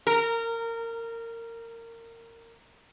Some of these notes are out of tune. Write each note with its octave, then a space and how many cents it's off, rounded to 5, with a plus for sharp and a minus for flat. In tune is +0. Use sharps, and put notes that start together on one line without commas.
A#4 -20